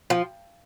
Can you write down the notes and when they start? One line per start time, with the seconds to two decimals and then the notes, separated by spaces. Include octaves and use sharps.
0.10 F3